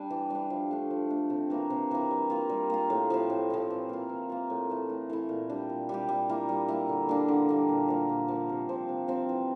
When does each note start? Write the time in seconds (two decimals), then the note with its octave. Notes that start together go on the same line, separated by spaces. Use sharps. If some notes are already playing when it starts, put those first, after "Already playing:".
Already playing: G3 D4
0.10 E3
0.30 G3 D4
0.50 F3
0.71 A3 D4
0.90 F3
1.10 A3 D4
1.30 C3
1.50 E3 A#3 E4
1.70 C3
1.91 E3 A#3 E4
2.11 G3
2.30 A#3 F4
2.50 G3
2.70 A#3 F4
2.90 A2
3.10 F3 C4 E4
3.30 A2
3.50 F3 C4 E4
3.70 E3
3.89 A#3 F4
4.09 E3
4.29 A#3 F4
4.50 A2
4.70 E3 A3 E4
4.90 A2
5.10 E3 A3 E4
5.29 A#2
5.49 G3 D4 G4
5.69 A#2
5.89 G3 D4 G4
6.09 G3
6.29 A#3 E4
6.49 G3
6.68 A#3 E4
6.89 D3
7.08 G3 A#3 D4
7.28 D3
7.49 G3 A#3 D4
7.69 A#2
7.88 F3 A#3
8.09 A#2
8.28 F3 A#3
8.49 C3
8.69 F3 C4
8.89 C3
9.08 F3 C4
9.29 E3